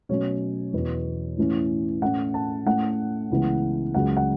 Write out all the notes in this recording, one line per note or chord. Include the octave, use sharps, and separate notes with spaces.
B2 F#3 A3 C#4 C#5
E2 B2 B3
A2 E3 C#4
A2 A3 C#4 F#5
A5
A2 A3 C#4 F#5
C#2 C#3 E3 B3
C#2 C#3 F#3 F#5
F#5